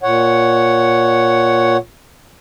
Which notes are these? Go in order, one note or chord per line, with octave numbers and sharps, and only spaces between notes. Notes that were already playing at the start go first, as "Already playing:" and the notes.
A#2 C#5 F#5